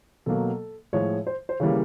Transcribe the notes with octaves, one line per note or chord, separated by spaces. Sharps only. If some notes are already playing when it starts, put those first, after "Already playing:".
B2 F#3 A#3 A4
A2 F3 G#3 C#5
C5
C5
C#3 E3 G3 A#3 C#5